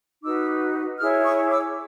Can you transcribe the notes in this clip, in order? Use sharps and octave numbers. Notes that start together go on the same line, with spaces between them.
D#4 F#4 B4 D6 E6
E4 G#4 C#5 D#6 F6
C#6 D#6
D6 E6